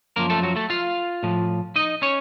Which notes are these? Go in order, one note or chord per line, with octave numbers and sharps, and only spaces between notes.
F#2 F3 A#3 A#4
A3 A4
F#3 F#4
A3 A4
F4 F5
A2 F3
D#4 D#5
C#4 C#5